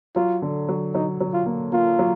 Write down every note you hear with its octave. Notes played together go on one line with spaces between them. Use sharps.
F#3 F4
D3
F#3
F#3 D#4
F#3
F4
A#3
A#3 F4
F#3